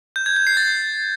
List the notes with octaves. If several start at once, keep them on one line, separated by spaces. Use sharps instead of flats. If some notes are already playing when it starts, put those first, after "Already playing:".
G6
G#6
G6
C7
A6